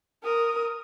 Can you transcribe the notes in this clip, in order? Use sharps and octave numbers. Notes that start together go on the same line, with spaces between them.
A#4 D#6